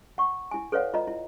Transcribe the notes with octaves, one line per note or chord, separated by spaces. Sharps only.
F#5 C#6
E4 G#5
A4 B4 C#5 D5 F5 F#5
F4 D#5 A#5
E4